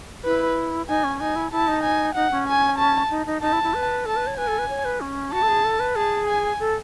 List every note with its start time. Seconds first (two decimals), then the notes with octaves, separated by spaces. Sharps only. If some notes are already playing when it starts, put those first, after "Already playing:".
0.25 E4 B4
0.88 D#4 G#5
1.04 C#4
1.20 D#4 G#5
1.36 E4
1.52 E4 A5
1.68 D#4
1.83 G#5
2.15 D#4 F#5
2.31 C#4
2.48 G#5
2.78 A5
3.10 D#4
3.26 D#4
3.42 D#4 A5
3.53 E4
3.64 E4
3.74 B4
4.05 A4 A5
4.16 B4
4.27 C#5
4.38 B4 G#5
4.47 A4
4.58 B4
4.69 C#5
4.85 B4
5.01 C#4
5.33 F#4 A5
5.43 A4
5.48 G#4
5.64 A4
5.80 B4
5.96 G#4 A5
6.28 G#5
6.60 A4